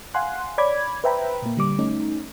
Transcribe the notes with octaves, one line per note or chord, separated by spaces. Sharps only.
F5 F#5 G#5 C6 F#6
C#5 D5 B5 D6 G#6
B4 C5 E5 G5 A#5 B5
A#2 A#3
D3 G3 D6
A3 C#4 D#4